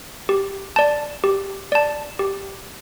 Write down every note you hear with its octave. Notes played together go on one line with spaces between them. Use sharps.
G4
D5 A5
G4
D5 A5
G4